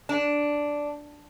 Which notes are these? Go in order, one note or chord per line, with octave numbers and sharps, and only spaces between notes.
D4